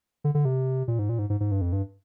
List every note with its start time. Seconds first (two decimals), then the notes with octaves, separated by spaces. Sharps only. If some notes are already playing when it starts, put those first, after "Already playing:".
0.24 D3
0.35 D3
0.45 C3
0.88 A#2
0.99 G#2
1.09 A#2
1.19 G#2
1.30 G#2
1.40 G#2
1.51 G2
1.61 F2
1.72 G2